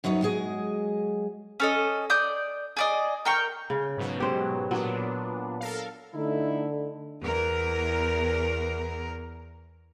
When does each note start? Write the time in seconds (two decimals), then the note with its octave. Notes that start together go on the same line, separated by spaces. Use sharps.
0.04 F#2 F#3 B3 D#4 C#5
0.22 F#3 G#3 G#4 D#5
1.60 C#4 A4 D#5
2.10 D5 D#6 G6
2.77 G#4 D5 D#5
3.25 A#4 G5 C#6
3.70 C#3
3.97 G#2 B2 F#3
4.20 G4 C5
4.71 A#2 F#3 B3 D4
5.61 A4 A#4 F5
6.15 D3 A3 D#4 E4
7.23 E2 A#4